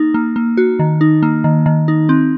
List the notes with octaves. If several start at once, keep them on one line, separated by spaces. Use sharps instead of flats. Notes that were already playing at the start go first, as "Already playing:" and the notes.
Already playing: A#3 D#4
A#3
A#3
F#4
D#3
D#4
A#3
D#3
D#3
D#4
C4